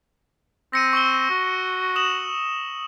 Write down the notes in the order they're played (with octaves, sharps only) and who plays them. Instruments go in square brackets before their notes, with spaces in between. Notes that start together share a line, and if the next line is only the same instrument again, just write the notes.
[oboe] C4 [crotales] A#6 C#7 D#7
[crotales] C#6 E6 G7
[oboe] F#4
[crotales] D#6 E7 F#7